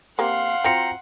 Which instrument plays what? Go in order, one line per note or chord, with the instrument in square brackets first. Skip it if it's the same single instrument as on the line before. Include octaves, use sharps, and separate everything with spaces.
[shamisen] A#3 C4 G4 [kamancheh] F5 [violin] F#5 C6
[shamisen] C4 F4 F#4 [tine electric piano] G5 A#5 C#7